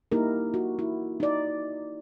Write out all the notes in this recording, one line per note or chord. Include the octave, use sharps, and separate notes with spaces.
A#3 D#4 E4 G4 A#4
F#4
E4
D#4 D5